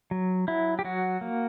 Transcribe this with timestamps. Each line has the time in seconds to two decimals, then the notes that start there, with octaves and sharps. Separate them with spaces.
0.11 F#3
0.48 F#3 E4
0.79 G4
0.85 F#3 F#4
1.21 A#3